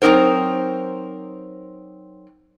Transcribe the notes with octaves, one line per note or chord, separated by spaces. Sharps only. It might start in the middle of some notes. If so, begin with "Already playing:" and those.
F#3 C4 D#4 A#4 C5